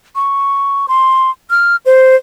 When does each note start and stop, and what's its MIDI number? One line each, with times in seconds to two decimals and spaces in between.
0.16 0.86 85
0.88 1.30 84
1.50 1.76 89
1.86 2.16 72